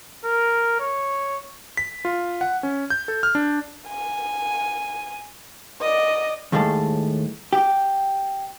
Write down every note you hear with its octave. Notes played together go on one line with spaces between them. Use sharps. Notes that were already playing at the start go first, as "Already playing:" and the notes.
A#4
C#5
B6
F4
F#5
C#4
G6
A4
F6
D4
G#5
D5 D#5
D#2 A2 G3 G#3 A4
G4